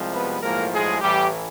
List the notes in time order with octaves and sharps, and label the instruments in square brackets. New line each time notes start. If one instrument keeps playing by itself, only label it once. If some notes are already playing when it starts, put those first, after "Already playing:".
Already playing: [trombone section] C2 C3 F3 G#3
B3 B4
B1 A2 F3 G#3 A#3 A#4
G#3 G#4
A1 A2 E3 G3 G4